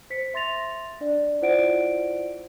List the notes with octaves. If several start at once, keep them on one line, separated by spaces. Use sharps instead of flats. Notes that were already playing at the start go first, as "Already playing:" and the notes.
C5 B6 C#7
E5 C6 A6 A#6 F7
D4 D5
E4 F4 C5 D5 F#5 D7